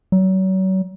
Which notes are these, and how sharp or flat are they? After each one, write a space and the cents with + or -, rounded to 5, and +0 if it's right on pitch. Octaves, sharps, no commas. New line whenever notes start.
F#3 +35